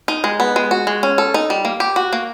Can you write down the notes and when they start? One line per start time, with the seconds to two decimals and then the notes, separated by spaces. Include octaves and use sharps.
0.08 D#4
0.24 G#3
0.40 B3
0.56 G#3
0.71 F#4
0.87 G#3
1.03 C#4
1.18 A4
1.34 D#4
1.50 G3
1.65 A#3
1.80 G4
1.96 F#4
2.13 A#3